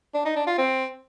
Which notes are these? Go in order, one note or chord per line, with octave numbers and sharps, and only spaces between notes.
D4
D#4
D4
F4
C4